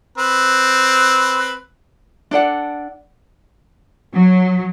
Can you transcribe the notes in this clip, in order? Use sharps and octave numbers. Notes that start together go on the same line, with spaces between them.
C4 B4
D4 A4 D5 F#5
F#3